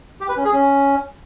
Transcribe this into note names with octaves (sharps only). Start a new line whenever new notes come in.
G4
B4
C#4
G#4
C#4